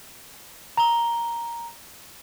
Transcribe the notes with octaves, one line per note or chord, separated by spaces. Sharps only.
A#5 G7